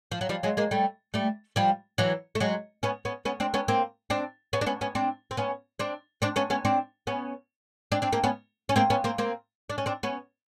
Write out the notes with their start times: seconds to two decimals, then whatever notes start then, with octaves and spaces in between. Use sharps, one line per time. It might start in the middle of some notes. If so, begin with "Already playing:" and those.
0.12 F3
0.21 F#3
0.29 F3 G3
0.43 F#3 G#3
0.57 G#3 A#3
0.71 G3 A3
1.14 G3 A3
1.56 F3 G3
1.98 E3 F#3
2.35 A3
2.40 F#3 G#3
2.83 B3 C#4
3.05 B3 C#4
3.25 B3 C#4
3.40 C4 D4
3.54 B3 C#4
3.68 A#3 C4
4.10 C4 D4
4.53 B3 C#4
4.61 D4
4.66 B3 C#4
4.81 B3 C#4
4.95 C4 D4
5.31 C4
5.37 B3 C#4
5.79 C4 D4
6.22 C4 D4
6.36 B3 C#4
6.50 B3 C#4
6.65 C4 D4
7.07 B3 C#4
7.92 C4 D4
8.02 C4 D4
8.12 A#3 C4
8.24 B3 C#4
8.69 C#4
8.76 A#3 C4
8.90 B3 C#4
9.04 A#3 C4
9.18 A#3 C4
9.70 D4
9.78 C#4
9.86 C4 D4
10.03 B3 C#4